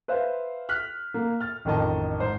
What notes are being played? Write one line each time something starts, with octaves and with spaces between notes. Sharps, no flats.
B4 C5 E5 F5
F6 F#6 B6
A#3
F6 A6
A1 F2 D#3 D#5 A5
G#2 C5